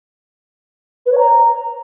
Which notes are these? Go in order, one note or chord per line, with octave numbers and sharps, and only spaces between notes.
B4
C#5
A#5